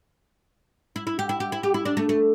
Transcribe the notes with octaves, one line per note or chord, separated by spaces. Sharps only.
E4
E4
G4
E4
G4
E4
G4
E4
D4
A3
A3